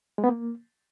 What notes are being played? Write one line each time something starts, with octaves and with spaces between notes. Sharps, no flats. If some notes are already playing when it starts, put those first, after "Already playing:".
G#3
B3
A#3